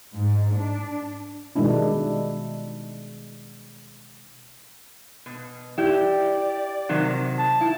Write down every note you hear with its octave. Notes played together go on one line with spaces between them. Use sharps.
G#2
D4
B2 D#3 G3 G#3 D4 E4
B2
E4 G4 D5
C3 D#3 F#3
A5
E4